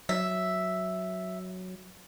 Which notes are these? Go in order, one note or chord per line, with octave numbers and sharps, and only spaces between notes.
F#3 E5